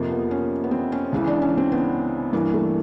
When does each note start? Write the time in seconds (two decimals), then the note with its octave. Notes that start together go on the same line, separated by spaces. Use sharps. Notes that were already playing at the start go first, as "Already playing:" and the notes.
Already playing: F2 C3 F3 A#3
0.11 B3
0.31 C#4
0.64 B3
0.71 C4
0.92 C#4
1.13 C#2 C#3 E3
1.27 D4
1.42 C#4
1.57 C4
1.72 B3
2.33 G2 E3 A#3
2.54 A3